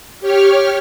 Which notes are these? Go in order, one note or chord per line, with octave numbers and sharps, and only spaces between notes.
G4 C#5 F6